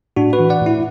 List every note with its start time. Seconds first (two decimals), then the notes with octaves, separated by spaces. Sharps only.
0.16 A2 D4 F#4
0.33 F#4 B4
0.39 E3
0.50 D5 F#5
0.61 A2
0.66 E4